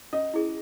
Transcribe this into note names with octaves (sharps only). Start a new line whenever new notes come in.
C#4 D#5
E4 G#4